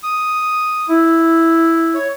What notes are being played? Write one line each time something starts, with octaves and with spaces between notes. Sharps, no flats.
D#6
E4
C#5